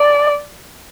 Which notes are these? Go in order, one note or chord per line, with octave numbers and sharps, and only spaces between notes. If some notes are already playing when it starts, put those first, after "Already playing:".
Already playing: D5